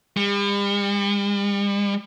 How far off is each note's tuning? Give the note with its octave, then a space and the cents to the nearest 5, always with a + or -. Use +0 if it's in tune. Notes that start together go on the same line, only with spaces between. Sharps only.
G3 +45